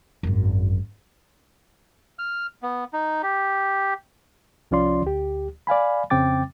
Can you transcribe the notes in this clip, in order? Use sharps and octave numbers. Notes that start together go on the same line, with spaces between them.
G#1 F#2
F6
B3
D#4
G4
C2 F3 C#4 F4 D5 C6
D2 G4
D5 F5 G#5 B5
F2 C#3 C4 G5 D6 A6